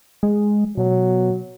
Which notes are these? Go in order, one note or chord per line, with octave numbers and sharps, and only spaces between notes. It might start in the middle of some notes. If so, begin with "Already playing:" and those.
G#3
B2 F#3